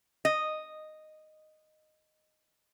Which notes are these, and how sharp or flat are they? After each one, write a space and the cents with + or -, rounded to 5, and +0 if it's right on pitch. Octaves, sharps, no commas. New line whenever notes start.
D#5 -5